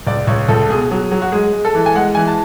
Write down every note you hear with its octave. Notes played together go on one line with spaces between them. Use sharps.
C#2 D5
C#2 C#5
C#2 A4
B2 G#4
F#3
F#3
F#4
G#3 G#4
G#3
A4
E3
G#5
G#3 F#5
E3 G#5
A5